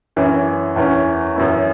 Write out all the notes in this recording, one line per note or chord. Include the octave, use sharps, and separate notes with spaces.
F#2 E3 C#4 E4
E2 E3 C#4
F#2 E3 B3 E4